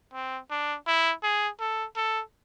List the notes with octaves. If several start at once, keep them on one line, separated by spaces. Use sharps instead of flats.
C4
D4
E4
G#4
A4
A4